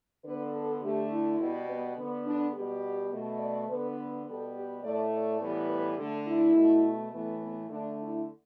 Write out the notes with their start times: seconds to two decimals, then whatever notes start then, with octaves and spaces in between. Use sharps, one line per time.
0.24 D3 B3 B4
0.52 A4
0.81 D3 A3 G4
1.10 E4
1.39 B2 G3 B3
1.67 B3
1.96 D3 B3
2.25 D4
2.53 B2 G3 B3 G4
3.11 B2 A3
3.39 D5
3.68 D3 B3 B4
4.26 B2 G3 B3 A4
4.55 G4
4.83 A2 A3 D5
5.12 D5
5.40 A2 E3 G3 B3
5.69 B4
5.98 D3 A3 A4
6.26 E4
6.55 B2 A3
7.12 A2 E3 A3 B3
7.41 B3
7.70 D3 A3 D4
7.99 E4